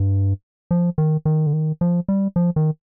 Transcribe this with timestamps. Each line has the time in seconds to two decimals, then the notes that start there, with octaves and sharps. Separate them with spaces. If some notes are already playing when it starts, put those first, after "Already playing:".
Already playing: G2
0.71 F3
0.98 D#3
1.25 D#3
1.47 D3
1.53 D#3
1.81 F3
2.09 G3
2.36 F3
2.56 D#3